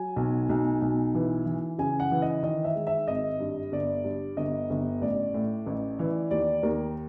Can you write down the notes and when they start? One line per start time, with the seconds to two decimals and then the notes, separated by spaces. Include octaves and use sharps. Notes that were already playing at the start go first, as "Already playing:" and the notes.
Already playing: F#3 G#5
0.16 B1
0.49 B1
0.82 B1
1.15 E3
1.46 E3
1.78 C#3 G#5
2.00 F#5
2.11 E3
2.22 D#5
2.43 D#3 D#5
2.64 E5
2.75 G#3
2.87 E5
3.08 G#1 D#5
3.40 G2
3.72 G1 D5
4.04 G2
4.37 G1 D#5
4.70 G1
5.01 A1 D5
5.34 A2
5.66 A1
5.99 E3
6.31 D#2 D5
6.63 D#2 A#4